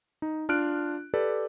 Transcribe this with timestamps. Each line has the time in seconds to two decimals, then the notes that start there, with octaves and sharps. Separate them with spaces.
0.22 D#4
0.49 D4 F4 F6 F#6 D7
1.14 G4 A4 B4 D5